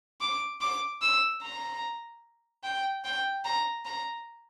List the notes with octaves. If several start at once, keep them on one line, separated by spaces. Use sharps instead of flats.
D6
D6
E6
A#5
G5
G5
A#5
A#5